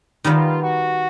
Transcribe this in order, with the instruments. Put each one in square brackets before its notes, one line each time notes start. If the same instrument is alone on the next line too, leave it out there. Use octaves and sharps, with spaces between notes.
[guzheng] D#3 G3 B3 [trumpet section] F4
[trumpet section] F#4